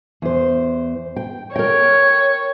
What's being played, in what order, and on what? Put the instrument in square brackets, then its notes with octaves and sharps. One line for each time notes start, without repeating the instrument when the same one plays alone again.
[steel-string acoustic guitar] E2 C5
G5
[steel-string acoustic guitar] A#4 G5 [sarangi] C#5